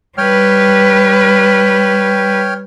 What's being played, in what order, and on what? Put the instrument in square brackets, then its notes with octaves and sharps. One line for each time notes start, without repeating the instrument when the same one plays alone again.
[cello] G3 B4 [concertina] C#5 G5 F6